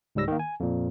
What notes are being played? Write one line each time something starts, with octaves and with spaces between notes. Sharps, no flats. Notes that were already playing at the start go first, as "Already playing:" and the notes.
C#2 G#2 G3 E6 A#6
D#3 A#3
G#5
F2 A#2